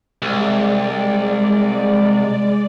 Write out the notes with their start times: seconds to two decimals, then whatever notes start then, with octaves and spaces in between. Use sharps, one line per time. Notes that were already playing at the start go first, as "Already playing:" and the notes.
0.22 C2 G#3 D5